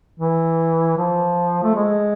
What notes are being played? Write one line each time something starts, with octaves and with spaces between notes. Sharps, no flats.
E3
F3
A3
G#3